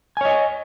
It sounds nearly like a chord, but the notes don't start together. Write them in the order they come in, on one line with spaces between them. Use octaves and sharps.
G#5 C#5 D#5